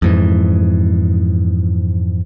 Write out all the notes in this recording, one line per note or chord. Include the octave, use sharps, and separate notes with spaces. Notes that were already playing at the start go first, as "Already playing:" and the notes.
F2 G#2 E3